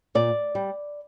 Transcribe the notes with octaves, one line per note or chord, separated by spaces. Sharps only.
A#2 D5
G3